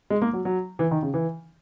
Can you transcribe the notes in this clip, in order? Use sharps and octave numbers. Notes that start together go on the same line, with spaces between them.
G#3
A#3
F#3
F#3
E3
D#3
C#3
E3